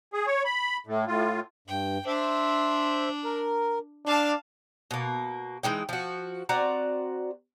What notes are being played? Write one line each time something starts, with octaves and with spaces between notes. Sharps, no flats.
G#4
C#5
B5
A2
A2 F4
G2 G5
D4 C5 E5
A#4
D4 D5 F5 A5
B2 A#3
E3 G#3 D#4 G5
F3 F#4
C4 F#4 D5 A#5